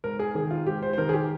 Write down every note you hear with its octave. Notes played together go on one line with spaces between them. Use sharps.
G#2 A#4
G#4
D#3 G#4
F4
G#2 G4
C5
C5
D#3 A#4
G#4
G4